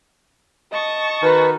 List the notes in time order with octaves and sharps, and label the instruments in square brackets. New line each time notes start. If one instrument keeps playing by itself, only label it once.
[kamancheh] D#5 [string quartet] A5 C#6 D#6
[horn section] D#3 F#4 [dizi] B4